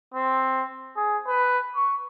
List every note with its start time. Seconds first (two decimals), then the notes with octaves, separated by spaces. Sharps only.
0.14 C4
0.97 G#4
1.27 B4
1.76 C#6